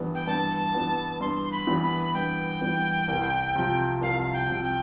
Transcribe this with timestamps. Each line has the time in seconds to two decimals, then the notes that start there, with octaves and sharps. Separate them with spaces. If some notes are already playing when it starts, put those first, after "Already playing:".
Already playing: G2 E3 G3 B3
0.15 G5
0.27 G2 A5
0.74 E3 G3 B3
1.20 G2 C6
1.52 B5
1.67 E3 G3 B3
1.83 B5
2.14 G2 G5
2.61 E3 G3 B3
3.08 C2
3.56 C3 F3
4.01 C2 F5
4.33 G5
4.48 C3 F3
4.64 G5